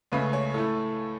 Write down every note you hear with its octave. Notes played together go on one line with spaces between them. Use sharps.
C#2 C#3 A3 B4
C#5
A2 A3 A4